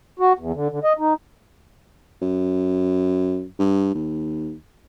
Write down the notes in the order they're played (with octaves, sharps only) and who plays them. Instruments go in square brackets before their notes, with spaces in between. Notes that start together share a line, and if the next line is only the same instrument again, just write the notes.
[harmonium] F#4
E2
D3
D3
D#5
D#4
[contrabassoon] F#2
G2
D#2